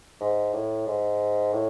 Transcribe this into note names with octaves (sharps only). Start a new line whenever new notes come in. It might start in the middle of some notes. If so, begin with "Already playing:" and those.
G#2
A2
G#2
A2